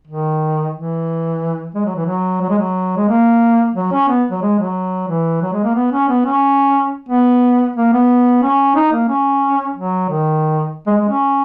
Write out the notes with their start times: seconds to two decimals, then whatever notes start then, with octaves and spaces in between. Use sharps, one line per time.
0.07 D#3
0.75 E3
1.75 G#3
1.85 F#3
1.96 E3
2.06 F#3
2.41 F#3
2.50 G#3
2.58 F#3
2.97 G#3
3.09 A#3
3.75 F#3
3.92 C#4
4.09 B3
4.31 F#3
4.42 G#3
4.59 F#3
5.08 E3
5.42 F#3
5.53 G#3
5.64 A#3
5.75 B3
5.92 C#4
6.09 B3
6.25 C#4
7.09 B3
7.76 A#3
7.93 B3
8.43 C#4
8.76 D#4
8.93 A#3
9.09 C#4
9.75 F#3
10.10 D#3
10.87 G#3
10.98 G#3
11.09 C#4